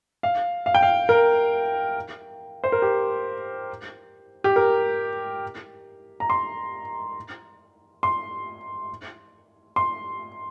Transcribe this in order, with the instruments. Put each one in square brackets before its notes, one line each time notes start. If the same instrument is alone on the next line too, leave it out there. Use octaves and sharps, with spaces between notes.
[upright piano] F5
F5
G5
F5
A#4
C5
A#4
G4
G4
A#4
A#5
C6
C6
C6